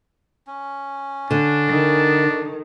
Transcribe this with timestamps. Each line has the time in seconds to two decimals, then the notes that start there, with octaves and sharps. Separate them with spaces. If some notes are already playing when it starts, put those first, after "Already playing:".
0.47 C#4
1.31 D3 D4
1.68 D#3